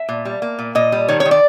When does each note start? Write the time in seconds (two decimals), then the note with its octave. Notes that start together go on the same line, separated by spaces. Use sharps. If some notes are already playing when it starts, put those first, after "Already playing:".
Already playing: E5
0.09 A#2
0.25 G3
0.42 A#3
0.59 A#2
0.75 A#2 D#5
0.92 G3
1.08 D#3 C#5
1.20 C#5
1.25 D#3
1.31 D5